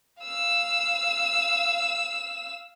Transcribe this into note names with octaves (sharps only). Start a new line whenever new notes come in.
F5 E6